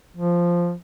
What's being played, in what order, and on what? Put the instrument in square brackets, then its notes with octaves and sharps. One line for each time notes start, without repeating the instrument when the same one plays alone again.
[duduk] F3